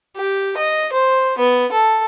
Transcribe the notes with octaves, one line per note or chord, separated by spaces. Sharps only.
G4
D#5
C5
B3
A4